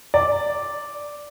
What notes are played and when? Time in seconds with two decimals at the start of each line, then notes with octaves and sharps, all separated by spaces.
0.14 D5